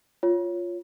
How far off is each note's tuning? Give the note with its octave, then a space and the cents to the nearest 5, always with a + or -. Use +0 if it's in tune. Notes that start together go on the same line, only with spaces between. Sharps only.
F4 +0 C#5 +0